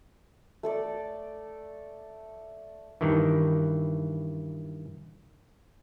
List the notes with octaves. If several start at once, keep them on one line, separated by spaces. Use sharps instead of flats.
A3 A4 D5
G2 D#3 E3